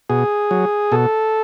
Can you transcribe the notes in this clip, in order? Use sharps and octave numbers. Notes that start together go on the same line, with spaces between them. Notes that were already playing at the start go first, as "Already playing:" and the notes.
B2 G#4
F#3
B2 A4